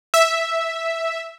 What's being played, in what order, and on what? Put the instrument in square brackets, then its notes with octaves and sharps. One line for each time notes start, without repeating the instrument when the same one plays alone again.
[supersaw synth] E5